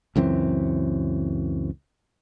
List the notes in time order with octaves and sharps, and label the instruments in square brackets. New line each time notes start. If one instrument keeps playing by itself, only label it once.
[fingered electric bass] C#2 F#2 E3 C4